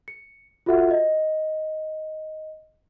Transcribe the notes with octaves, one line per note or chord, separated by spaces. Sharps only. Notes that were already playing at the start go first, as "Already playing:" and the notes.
C#7
F4 F#4 A4 E5 F#5
D#5